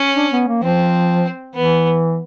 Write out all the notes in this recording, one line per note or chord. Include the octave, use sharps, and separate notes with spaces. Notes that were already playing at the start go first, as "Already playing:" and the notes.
Already playing: C#4
D4
B3
A#3
F3 C4
E3 B3